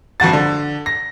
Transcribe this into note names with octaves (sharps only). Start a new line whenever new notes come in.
G1 F2 F#4 A6
D3
A#6